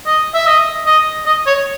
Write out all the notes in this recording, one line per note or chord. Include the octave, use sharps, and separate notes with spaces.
D#5
E5
D#5
D#5
D#5
C#5